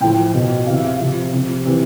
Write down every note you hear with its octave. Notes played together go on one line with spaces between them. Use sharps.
A2 F3 G5
B2
C3 E3 F5
E5
F5
C3 F3
C3 F3
C3 E3